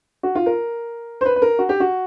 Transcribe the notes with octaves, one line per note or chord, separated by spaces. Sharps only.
F#4
F4
A#4
C5
B4
B4
A#4
F#4
G4
F#4